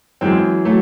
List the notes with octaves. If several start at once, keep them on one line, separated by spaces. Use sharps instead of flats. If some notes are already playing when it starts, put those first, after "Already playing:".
F#2 E3 G#3 C4
F#3 A3